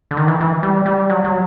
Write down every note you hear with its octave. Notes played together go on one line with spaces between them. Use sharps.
D3
D#3
E3
E3
G3
G3
F#3
F#3